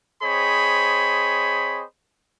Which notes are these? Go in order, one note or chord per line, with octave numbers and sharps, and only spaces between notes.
C4 G#4 C5 C#5 D#5 B5